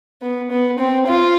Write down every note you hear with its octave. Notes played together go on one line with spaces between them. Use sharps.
B3
B3
C4
F4